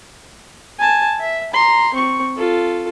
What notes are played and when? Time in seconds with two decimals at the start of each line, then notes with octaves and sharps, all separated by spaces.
0.79 G#5 A5
1.20 E5
1.53 A#5 C6
1.94 C4 C#6
2.36 F4 A4